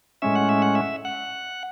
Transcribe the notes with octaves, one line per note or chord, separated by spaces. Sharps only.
A2 G#3 C#4 E5
F#5
E5
F#5
E5
F#5